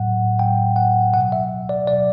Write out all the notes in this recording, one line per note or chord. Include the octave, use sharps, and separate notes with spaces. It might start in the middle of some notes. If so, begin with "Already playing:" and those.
Already playing: A2 F#3 F#5
A2 F#3 G5
F#5
B2 F#3 F#5
E5
D5
B2 F#3 D5